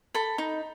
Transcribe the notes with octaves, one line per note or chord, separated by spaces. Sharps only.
A4 B5
D#4